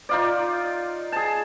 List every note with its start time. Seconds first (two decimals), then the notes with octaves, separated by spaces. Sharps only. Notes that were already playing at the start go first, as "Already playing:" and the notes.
0.09 D#4 F4 D5
1.12 G#4 A5